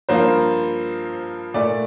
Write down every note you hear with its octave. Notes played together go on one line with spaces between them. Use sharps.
G2 F3 A#3 C5
A#2 A3 D5